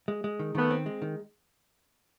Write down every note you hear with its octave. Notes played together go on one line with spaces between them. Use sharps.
G#3
G#3
D#3
D#3 A3 B3
C4
G#3
D#3